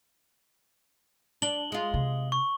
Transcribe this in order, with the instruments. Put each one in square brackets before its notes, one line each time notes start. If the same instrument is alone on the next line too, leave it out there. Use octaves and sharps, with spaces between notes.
[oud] D4 [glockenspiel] F#7 G7
[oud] G#3 F4
[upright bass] C3
[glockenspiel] C#6